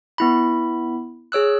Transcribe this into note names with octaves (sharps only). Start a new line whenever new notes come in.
B3 E4 B5
G#4 C#5 E6 F#6